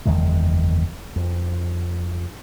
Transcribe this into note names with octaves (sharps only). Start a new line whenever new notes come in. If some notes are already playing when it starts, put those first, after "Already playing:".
F#1 E2 D#3 G#3
F2